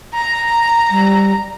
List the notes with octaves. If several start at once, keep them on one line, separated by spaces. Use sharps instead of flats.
A#5
G3